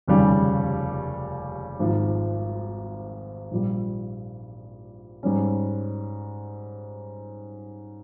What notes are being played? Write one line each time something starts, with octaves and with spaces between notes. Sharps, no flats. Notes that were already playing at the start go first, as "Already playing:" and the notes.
F1 D#2 C#3 G3 C#4
G#1 G#2 F3
A#1 A#2 G3
G#2 G3 C#4